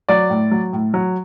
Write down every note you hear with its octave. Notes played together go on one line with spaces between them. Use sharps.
F#3 D5
A2
F#3
A2
F#3